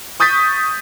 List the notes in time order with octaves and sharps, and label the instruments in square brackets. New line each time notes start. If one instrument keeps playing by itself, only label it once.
[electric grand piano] C#6 D#6 G6 A6 B6